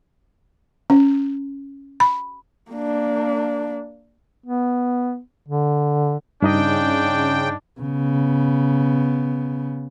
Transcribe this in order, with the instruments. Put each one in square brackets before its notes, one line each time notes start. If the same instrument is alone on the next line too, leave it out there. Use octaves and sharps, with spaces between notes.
[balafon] C#4
B5
[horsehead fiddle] A#3 D4
[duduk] B3
D3
[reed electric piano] G2 D#4 D#5 [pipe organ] C#3 G5 [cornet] D4
[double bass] C#3 B3